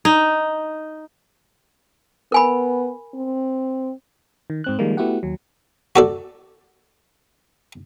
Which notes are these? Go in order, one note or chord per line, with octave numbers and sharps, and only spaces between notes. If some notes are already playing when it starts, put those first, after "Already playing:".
D#4
B3 A#4 G#5 B5
C4
D#3
G#2 C4 F#6
D#3 F3 G3 G#3 A#3
A3 B3 E4 F#4 G4 F#5
D#2 F#3
F#4 A4 D5